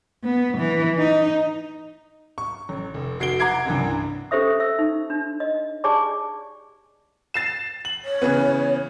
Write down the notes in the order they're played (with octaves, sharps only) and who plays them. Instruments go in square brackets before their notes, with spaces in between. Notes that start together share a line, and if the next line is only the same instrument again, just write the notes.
[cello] B3
E3
D#4
[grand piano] C#6
A1
F1
F1 F#4 C7 D7 G7
F#5 A#5 D6 G#6 C7 D7
F#1 C2 G2 E3
[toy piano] C#4 G4 A4 C5 E5 D#6
E5 E6
D#4
D4
D#5
G4 G#4 D5 G#5 A5 D6
[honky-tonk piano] A6 C7 E7
F#7
[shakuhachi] C#5
[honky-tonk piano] C#3 E3 B3